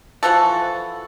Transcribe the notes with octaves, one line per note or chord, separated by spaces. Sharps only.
E3 F3 F#4 A4